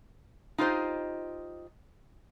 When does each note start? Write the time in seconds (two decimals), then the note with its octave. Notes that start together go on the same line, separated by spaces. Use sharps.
0.58 D#4 F4 G4 C5 D#5